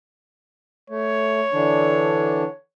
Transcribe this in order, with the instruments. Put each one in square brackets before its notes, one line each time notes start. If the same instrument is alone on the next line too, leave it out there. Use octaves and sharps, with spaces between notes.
[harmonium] A3 [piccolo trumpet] C#5
[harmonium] D3 E3 D4